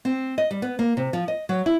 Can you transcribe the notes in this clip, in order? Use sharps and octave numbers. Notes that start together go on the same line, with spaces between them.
C4
D#5
G3
B3
A#3
C3
F3
D#5
F#3
E4